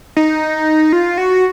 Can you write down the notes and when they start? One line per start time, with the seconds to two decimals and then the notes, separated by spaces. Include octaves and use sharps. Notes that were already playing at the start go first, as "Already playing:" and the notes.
0.17 D#4
0.93 F4
1.18 F#4